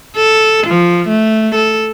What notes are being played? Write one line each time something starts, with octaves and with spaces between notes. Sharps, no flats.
A4
F3
A3
A4